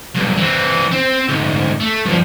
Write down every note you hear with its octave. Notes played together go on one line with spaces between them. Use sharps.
B1 G2
E3 C4
C4
D2 G#2
A3
G2 F3